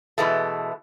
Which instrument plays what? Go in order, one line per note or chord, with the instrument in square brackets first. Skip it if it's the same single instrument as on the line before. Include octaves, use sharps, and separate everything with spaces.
[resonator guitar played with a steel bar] B2 E3 G#3 A3